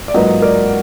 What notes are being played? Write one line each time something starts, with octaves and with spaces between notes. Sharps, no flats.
D5
G#2 F#3 A#3 F4 B4 D#5
A#4 D5